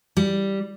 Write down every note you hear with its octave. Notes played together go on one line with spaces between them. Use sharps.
G3